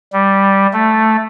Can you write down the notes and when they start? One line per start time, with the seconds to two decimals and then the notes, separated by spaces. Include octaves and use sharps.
0.13 G3
0.73 A3